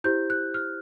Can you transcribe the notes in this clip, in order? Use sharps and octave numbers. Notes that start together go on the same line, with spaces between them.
E4 G4 C5 G6
F#6
F6